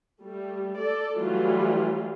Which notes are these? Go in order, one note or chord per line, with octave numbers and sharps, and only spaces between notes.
G3 A3
A4 D5
E3 F#3 G3 A3 F4